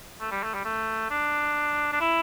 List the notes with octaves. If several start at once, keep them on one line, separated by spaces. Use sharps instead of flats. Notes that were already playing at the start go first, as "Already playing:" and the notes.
A3
G3
A3
G3
A3
D4
D4
E4